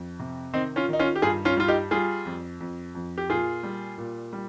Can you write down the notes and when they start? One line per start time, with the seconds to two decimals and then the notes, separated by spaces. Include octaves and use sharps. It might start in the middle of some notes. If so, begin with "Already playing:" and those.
Already playing: F2
0.19 C3
0.54 D#3 C4 D#4
0.76 C#4 F4
0.89 D#3 D#4
0.99 C#4 F4
1.16 G4
1.22 G2 F4 G#4
1.45 C#4 F4
1.57 G3 F4
1.68 D#4 G4
1.91 G3 F4 G#4
2.25 F2
2.61 F2
2.95 F2
3.18 G4
3.29 A#2 F4 G#4
3.63 G3
3.98 A#2
4.33 G3